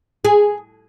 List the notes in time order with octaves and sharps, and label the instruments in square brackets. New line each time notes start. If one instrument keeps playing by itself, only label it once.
[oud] G#4